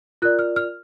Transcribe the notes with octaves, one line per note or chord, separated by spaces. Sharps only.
F4 A#4 D5 F#6
F6
F6